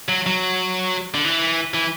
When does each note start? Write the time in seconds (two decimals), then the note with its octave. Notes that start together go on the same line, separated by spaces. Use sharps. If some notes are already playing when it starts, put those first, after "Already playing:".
0.09 F#3
0.26 F#3
1.15 D3
1.25 E3
1.74 E3